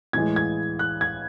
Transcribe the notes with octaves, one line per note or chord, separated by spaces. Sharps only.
A2 E3 G#3 G#6
G#6
F#6
G#6